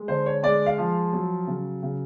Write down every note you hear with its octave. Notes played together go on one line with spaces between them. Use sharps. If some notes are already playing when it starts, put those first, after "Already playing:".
Already playing: G#3
D3 C5
C#5
G#3 D5
F5
F3
F#3
C#3
C#3